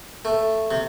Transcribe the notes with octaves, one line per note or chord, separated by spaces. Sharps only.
A3
C3